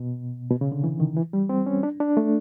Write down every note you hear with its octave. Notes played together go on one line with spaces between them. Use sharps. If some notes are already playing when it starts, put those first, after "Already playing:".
Already playing: B2
B2
C#3
D3
E3
D#3
E3
G3
C4
C#4
D4
D4
A3